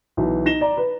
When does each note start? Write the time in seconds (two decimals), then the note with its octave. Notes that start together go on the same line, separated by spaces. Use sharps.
0.17 B1 E3
0.45 D#4 A#6 E7 G7
0.61 D5 A#5
0.77 B4